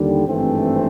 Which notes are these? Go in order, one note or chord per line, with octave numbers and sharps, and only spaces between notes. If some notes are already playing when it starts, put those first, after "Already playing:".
Already playing: D#2 D3 G3
G#1 G2 E3 A3 C4